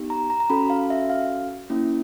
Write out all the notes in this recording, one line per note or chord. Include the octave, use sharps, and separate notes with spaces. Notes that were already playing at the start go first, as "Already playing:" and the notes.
Already playing: B3 D#4 G4
A#5
A#5
A#5
C#4 F#4 A4 B5
F5
E5
F5
A#3 C#4 E4